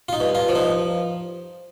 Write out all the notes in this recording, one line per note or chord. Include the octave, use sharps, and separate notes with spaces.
F4
D#4
G2
F4
F3
D#4